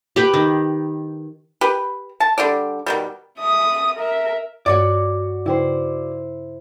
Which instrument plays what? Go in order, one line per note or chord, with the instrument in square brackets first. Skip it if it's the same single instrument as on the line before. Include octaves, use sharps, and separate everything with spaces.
[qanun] G4 B4 G5
D#3
[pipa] G4 B4
A5
D3 G3 D5
B2 D#3 G3
[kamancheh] E5 D#6
A#4 E5
[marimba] G2 [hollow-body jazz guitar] F#4 C#5 D5
[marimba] C#3 G5 [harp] E4 C5